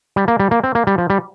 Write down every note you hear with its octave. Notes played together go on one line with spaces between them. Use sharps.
G3
A#3
G3
A#3
C4
A#3
G3
F3
G3